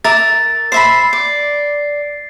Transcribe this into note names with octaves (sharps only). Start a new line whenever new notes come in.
A#4 E5 D6 A6
C5 E5 B5 C7
D5